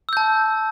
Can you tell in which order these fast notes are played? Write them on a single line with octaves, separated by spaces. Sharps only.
E6 G6 A5